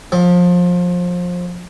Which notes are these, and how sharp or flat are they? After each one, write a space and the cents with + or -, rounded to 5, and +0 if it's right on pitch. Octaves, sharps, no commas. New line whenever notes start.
F3 +25